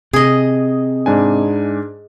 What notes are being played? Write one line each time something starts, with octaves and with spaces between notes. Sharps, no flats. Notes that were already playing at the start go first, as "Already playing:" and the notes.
C3 G#4 D#5
G#2 D4 G#5